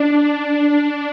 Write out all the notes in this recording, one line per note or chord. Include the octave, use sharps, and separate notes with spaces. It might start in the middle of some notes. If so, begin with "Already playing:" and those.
Already playing: D4
D4